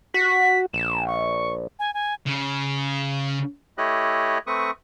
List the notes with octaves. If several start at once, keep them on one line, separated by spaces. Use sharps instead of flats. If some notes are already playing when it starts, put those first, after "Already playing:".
F#4 B6
A#1 E7
C#6
G#5
G#5
C#3
A3 E4 G4 C#5 D#5 F#6
A3 C4 B4 C#6 D#6